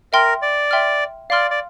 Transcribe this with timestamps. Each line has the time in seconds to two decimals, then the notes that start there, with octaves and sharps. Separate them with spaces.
0.13 A#4 E5 G5 C6 F6
0.42 D5
0.71 E5 G5 C6 F6
1.30 D5 F5 C6 F6
1.51 D5